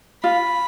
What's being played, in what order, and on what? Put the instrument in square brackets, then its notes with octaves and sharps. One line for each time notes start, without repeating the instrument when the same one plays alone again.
[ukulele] F4 [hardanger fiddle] B5